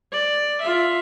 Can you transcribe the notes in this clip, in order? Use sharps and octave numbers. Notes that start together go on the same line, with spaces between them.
D5
F4 E5